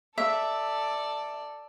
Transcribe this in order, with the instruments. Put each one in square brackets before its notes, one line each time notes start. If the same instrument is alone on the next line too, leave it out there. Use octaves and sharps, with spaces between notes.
[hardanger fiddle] A4 D5 [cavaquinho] E5